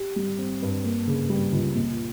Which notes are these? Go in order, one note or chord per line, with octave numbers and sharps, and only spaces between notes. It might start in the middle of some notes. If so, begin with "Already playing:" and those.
Already playing: G4
G3
C4
G2
A#3
C#3
G3
C#2
A#2